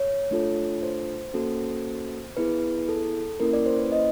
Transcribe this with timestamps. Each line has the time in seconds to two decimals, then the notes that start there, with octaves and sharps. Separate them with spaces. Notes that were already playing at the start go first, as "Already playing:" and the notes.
Already playing: C#5
0.31 A3 D4 F4 A4
0.83 C5
1.34 A#3 C#4 F#4 A4
2.37 B3 E4 G#4 B4
2.89 A4
3.40 A#3 C#4 E4 A#4
3.53 D5
3.66 C5
3.79 B4
3.92 D#5